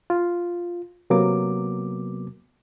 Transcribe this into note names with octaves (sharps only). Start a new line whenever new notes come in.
F4
C3 F#3 A#3 B3 D6